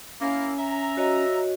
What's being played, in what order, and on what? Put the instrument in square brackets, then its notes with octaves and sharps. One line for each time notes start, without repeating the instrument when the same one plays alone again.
[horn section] A#3 E4 [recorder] C#4
[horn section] E5 A#5
[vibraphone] F#4 C#5 D#5